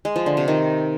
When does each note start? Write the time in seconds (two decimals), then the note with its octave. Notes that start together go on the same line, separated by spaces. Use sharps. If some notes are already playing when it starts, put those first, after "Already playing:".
0.05 G#3
0.16 F3
0.26 D3
0.37 C3
0.48 D#3